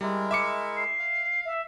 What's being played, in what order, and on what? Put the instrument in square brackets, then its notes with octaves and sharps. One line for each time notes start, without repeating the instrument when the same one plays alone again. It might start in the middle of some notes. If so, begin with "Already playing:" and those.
[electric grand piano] G3 [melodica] G#3 E4 A#4
[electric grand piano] E5 D6 C#7
[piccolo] C7
[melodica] F5
[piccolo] E5